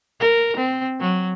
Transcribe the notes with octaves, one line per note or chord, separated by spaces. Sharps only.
A#4
C4
F#3